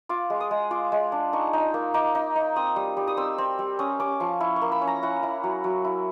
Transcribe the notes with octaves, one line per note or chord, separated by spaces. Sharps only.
F4 D6
G#3
D#6
G#3
F4 D6
G#3
D4
D#4 C#6
D#4
A#3
D#4 D6
D#4
D#4
C4 D#6
G3
G3
D#6
C4 E6
C4
G3
C#4 D#6
C#4 D6
F3 C#6
E4 C#6
C#6
A#3
B5
C#4
A#5
E4 F#5
E4
F#3
F#3
E4